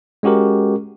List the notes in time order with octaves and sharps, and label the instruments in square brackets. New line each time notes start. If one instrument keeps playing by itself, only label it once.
[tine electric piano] G#3 C#4 F#4 G4 A#4